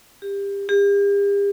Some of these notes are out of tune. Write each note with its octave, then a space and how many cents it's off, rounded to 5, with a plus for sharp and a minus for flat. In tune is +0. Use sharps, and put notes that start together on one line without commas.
G4 +25
G4 +45